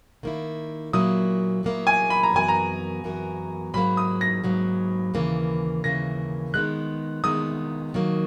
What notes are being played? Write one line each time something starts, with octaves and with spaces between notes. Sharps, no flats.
D#3 A#3 E4
A#2 F#3 A#3 E4 D#6
A#2 F#3 A#3 E4
G#5
B5
A#5
F#2 E3 B3 F#4 A#4 G#5
A#5
F#2 E3 B3 F#4 A#4
G#2 F#3 A#3 B5
D#6
A#6
G#2 F#3 A#3
D#2 C#3 E3 A#3
D#2 C#3 E3 A#3 A#6
D#3 G#3 B3 F#6
D#3 G#3 B3 D#6
D#3 F#3 A#3